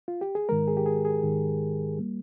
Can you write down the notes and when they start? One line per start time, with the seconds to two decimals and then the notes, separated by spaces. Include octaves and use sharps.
0.08 F4
0.21 G4
0.35 G#4
0.49 G#2 D#3 G#3 A#4
0.68 G#4
0.77 G4
0.86 G#4
1.05 G#4
1.23 G#2 D#3 G#3
1.99 G3 A#3